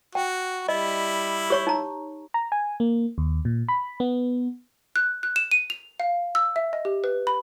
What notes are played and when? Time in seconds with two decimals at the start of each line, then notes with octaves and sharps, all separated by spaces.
0.15 F#4 G5
0.69 G3 E4 D#5
1.50 G4 C#5 C#6
1.67 D#4 A#5
2.34 A#5
2.52 G#5
2.80 A#3
3.18 D#2
3.45 A#2
3.69 B5
4.00 B3
4.96 F#6
5.23 F#6
5.36 E7
5.51 D#7
5.70 F7
6.00 F5
6.35 E6
6.56 E5
6.73 D#5
6.85 G4
7.04 B4
7.27 B5